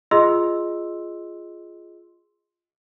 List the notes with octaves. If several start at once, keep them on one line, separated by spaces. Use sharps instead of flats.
F4 G#4 D#5 C6 E6